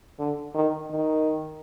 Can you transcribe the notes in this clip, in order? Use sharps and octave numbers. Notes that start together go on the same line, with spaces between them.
D3
D#3
D#3